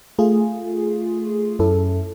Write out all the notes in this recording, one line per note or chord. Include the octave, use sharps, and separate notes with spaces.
A3 F4 G#4
F#2 C#4 E4 A4